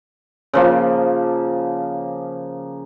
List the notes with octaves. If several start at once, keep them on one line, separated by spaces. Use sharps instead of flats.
C#3 F3 A#3